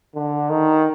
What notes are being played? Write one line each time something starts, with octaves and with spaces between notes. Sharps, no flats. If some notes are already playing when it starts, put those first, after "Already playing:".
D3
D#3